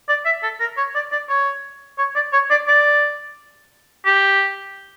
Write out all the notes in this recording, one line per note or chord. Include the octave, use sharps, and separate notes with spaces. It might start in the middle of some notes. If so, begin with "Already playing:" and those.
D5
E5
A4
A#4
C#5
D5
D5
C#5
C#5
D5
C#5
D5
D5
G4